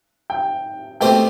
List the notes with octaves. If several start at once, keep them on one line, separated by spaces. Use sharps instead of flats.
G5
B2 A3 C4 G4 C5 G5